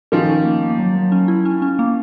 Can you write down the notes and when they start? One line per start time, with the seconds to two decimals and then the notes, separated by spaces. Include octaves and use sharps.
0.12 D#3 F3 C#4
0.29 C#4
0.45 A#3
0.62 A#3
0.79 F#3
0.96 F#3
1.12 C#4
1.28 E4
1.45 C#4
1.62 C#4
1.79 A#3